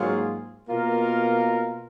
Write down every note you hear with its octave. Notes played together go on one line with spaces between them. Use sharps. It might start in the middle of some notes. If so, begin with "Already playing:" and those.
Already playing: G#2 F#3 A#3 F4 G#4
B2 A#3 F4 A#4